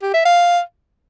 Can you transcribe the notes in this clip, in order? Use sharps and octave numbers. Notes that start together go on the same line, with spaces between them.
G4
E5
F5